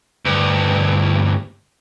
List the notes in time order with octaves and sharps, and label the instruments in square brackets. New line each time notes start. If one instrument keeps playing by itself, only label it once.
[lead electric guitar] D2 G2